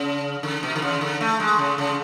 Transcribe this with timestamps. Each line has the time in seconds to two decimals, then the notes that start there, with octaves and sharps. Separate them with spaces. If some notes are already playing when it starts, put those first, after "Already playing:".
Already playing: C#3
0.43 D3
0.63 B2
0.76 D3
0.82 C#3
1.01 D3
1.21 A3
1.40 G#3
1.59 C#3
1.78 C#3